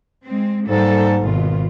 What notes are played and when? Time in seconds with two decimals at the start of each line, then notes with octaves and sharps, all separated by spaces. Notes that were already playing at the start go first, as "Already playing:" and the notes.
0.25 G#3 C4
0.69 G#2 G3 A#3 A4
1.21 G#1 B2 F4